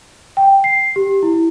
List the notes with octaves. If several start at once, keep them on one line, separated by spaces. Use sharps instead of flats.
G5
C7
G4
E4